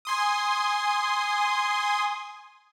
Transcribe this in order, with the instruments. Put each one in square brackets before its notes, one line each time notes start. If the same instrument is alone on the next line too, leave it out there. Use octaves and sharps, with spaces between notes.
[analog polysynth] G#5 C6 D#6